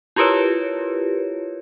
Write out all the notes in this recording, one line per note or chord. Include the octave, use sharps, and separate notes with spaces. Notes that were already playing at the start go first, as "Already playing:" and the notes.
E4 F4 G4 A#4 B4 C#5